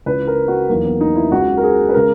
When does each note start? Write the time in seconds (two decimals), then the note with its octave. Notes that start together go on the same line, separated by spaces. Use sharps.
0.06 C#2 C#3 E3 B4
0.27 A#4
0.48 F#4
0.69 E2 D#3 F#3 A#3
0.85 B3
1.01 D#4
1.16 E4
1.32 C#2 C#3 E3 G#3 F#4
1.57 A#4
1.63 G#4
1.89 B4
1.94 C#3 G#3 A#4